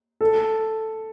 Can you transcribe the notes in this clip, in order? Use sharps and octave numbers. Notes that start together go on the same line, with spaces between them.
A4